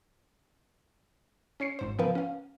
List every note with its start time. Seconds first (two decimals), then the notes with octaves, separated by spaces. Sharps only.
1.60 C#4 C#5 C7 C#7
1.79 G#1 G#2 C5
1.99 C#3 F3 B3 A#4 B4 F5
2.15 C#4 F5